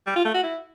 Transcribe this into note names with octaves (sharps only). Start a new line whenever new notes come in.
G3
F4
A3
F#4
E4